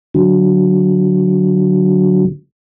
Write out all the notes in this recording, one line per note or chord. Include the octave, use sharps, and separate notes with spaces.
D3 F#3